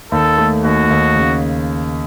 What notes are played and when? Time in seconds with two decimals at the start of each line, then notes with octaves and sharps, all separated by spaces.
0.12 D#2 A4
0.38 A3
0.64 D#2 F#4
0.90 D#2
1.16 C#3